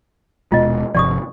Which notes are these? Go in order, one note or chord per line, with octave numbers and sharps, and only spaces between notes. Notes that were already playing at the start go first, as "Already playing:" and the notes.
D#1 B2 G#3 F4 D#5
G1 C3 F3 D5 C#6 D#6